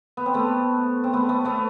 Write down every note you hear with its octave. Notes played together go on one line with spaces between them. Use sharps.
B3
C4
A3 B3
C4
A3 B3
A3 B3
A3 B3